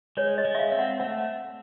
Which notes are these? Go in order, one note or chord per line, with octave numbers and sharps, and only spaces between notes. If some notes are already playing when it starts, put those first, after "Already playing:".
G#3 C#5
D#5
G#3
E5
F5
C4
F#5
A3 F#5